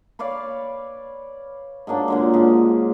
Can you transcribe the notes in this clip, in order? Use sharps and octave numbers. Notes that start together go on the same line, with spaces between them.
B4 C#5 D5 F5
G#2 F#3 A#3 D4
A#2 D3 G#3
G#2 C#3